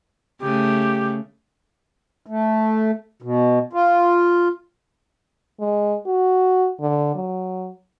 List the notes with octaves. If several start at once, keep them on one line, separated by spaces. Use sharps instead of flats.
C#3 A3 G4
A3
B2
F4
G#3
F#4
D3
F#3